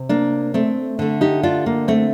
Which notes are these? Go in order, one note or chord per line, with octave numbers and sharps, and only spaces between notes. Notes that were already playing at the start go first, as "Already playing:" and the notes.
Already playing: C3
A#3 D4
A3 C4
D3 A3
D#4 G4
D4 F4
A#3
A3 C4